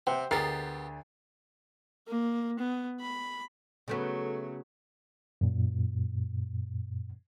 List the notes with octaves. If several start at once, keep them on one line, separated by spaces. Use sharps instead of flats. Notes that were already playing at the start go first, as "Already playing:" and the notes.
C3 C5 F#5 G5
D2 B3 G4 G#4 A#4 A6 C7
A#3
B3
B5
C#3 F#3 A3 B3
F#2 A#2